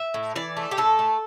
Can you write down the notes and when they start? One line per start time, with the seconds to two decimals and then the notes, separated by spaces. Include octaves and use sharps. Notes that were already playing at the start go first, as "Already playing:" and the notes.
Already playing: E5
0.14 A2
0.36 E3 D5
0.57 A3
0.71 G4
0.77 A2 A4
0.99 A3